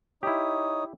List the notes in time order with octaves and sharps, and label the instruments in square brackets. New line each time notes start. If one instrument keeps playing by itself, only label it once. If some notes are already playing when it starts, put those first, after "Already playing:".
[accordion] D#4 C#5 D#6 [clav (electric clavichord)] E4 G4